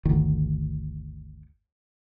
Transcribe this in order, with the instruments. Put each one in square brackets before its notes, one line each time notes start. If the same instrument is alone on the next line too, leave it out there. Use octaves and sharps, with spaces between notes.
[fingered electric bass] G1 D2 D#3